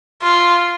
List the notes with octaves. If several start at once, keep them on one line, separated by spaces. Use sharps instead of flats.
F4